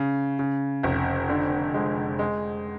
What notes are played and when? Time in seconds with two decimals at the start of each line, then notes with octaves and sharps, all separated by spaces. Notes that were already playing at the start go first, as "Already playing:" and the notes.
Already playing: C#3
0.39 C#3
0.83 F1
1.29 D3
1.74 G#3
2.19 G#3